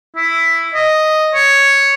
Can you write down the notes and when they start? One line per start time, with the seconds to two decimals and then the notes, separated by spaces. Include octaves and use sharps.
0.16 E4
0.74 D#5
1.34 C#5